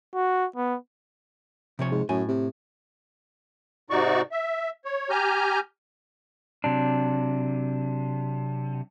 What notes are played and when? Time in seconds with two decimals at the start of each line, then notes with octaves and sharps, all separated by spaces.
0.15 F#4
0.56 B3
1.79 C3 F3 C#5
1.91 G#2
2.09 F#2 A2 G#5
2.28 C3
3.90 G#2 C3 D#4 F#4 D5 C#6
4.32 E5
4.85 C#5
5.10 G4 G#5 A#5 F6 G6
6.64 C3 F#3 D4